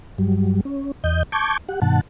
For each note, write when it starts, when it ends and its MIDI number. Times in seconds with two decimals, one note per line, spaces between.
0.18 0.61 43
0.18 0.61 54
0.18 0.61 55
0.65 0.92 61
1.04 1.23 40
1.04 1.23 75
1.04 1.23 91
1.32 1.57 81
1.32 1.57 85
1.32 1.57 86
1.32 1.57 91
1.32 1.57 92
1.69 1.80 67
1.69 1.80 78
1.82 2.01 43
1.82 2.01 47
1.82 2.01 51
1.82 2.01 78
1.82 2.01 81